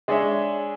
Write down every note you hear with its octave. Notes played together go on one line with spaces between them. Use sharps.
G#3 D4 G#4 C#5 E5